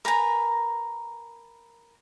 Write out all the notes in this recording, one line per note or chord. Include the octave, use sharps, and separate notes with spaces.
A#4 B4 G#5 A#5